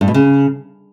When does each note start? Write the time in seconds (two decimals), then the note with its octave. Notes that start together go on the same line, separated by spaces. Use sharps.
0.01 G2
0.08 B2
0.14 C#3